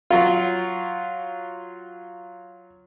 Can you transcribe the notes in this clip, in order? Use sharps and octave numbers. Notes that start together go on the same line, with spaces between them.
F#3 F4